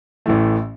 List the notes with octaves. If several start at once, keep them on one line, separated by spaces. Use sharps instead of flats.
A1 A2 E3 A3